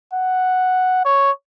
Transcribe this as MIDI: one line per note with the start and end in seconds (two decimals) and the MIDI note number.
0.14 1.01 78
1.05 1.32 73